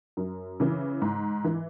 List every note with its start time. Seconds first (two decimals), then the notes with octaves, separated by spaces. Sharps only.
0.17 F#2
0.60 C#3 E3
1.02 G#2
1.45 E3